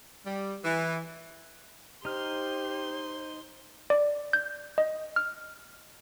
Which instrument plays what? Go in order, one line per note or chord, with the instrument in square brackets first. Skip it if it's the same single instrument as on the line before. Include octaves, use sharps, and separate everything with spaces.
[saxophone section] G3
E3
[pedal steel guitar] D#4 F6 [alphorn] G4 [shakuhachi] C5 [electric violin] C6
[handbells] D5
G6
D#5
F6